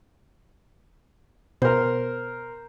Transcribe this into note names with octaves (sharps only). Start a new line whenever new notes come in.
B2 B3 A#4 C5